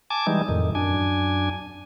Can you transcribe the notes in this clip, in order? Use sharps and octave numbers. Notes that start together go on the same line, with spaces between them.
G#5 A5 D6
E3 G3 G#3 D#4
F2 A2 D#3
F#2 D4 G#5